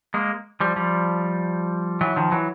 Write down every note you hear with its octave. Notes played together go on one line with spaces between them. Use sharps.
G#3 A#3
F3 G3
F3 G3
E3 F#3
D#3 F3
E3 F#3